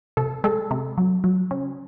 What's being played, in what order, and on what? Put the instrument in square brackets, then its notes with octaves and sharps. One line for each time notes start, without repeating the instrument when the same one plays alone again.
[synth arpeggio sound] C3 A4
G#3 A4
C3
F#3
F#3
C#3